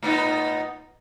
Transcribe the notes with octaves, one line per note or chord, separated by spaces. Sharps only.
A2 B3 D#4